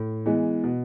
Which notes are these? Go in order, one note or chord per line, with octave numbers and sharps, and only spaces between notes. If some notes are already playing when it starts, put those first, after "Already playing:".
Already playing: A2
E3 G#3 B3
B2